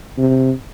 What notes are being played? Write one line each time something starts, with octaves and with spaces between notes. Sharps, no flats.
C3